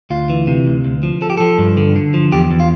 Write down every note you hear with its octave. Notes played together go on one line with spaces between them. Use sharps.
D2 F4
E3
C3
D2
D2
F3
F3 A4
G4
F3 A4
G2
D3
D3
F3
E2 G4
E2
F4